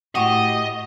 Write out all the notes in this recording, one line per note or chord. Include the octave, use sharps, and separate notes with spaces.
A2 F#4 G4 D#5 C#6